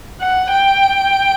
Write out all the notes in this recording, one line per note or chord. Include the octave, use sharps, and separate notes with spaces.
F#5
G5